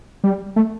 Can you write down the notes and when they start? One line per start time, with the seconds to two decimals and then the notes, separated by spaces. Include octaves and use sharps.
0.24 G3
0.56 A3